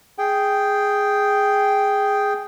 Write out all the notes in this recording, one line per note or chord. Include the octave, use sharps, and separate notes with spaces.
G#4 G5